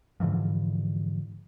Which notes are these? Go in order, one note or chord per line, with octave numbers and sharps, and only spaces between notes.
G#2 D3 E3 F3